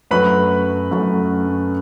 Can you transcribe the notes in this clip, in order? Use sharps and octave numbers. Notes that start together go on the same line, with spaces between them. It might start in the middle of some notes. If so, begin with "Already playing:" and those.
F#2 F#3 A3 B4 B5
F#2 F#3 A3